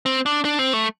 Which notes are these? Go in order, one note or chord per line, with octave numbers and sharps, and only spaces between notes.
C4
D4
D4
C4
A3